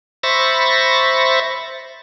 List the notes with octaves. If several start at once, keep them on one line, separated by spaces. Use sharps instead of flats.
C5 E5 B5 C#6 A6 A#6